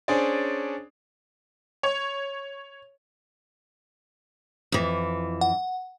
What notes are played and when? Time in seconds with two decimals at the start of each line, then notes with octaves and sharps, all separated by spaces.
0.08 C#4 D4 G#4 C5 D5
1.83 C#5
4.72 F2 E3
5.41 F#5